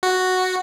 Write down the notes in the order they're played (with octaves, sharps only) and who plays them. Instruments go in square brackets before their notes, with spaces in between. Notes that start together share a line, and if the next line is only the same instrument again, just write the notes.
[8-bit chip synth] F#4